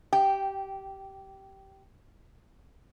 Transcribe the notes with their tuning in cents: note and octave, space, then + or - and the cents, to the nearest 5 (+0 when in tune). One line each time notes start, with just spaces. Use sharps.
G4 -15 G5 +0